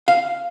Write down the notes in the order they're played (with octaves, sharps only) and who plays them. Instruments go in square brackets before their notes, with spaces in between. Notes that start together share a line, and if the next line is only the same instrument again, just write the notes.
[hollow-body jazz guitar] F5